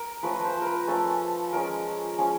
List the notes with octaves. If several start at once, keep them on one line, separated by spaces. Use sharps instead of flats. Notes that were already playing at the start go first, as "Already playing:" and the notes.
Already playing: A#4
F3 A3 C#4 B4
C5
A#4
B4
F3 A3 C#4 A4
F3 G#3 C#4 A#4
F3 G#3 C#4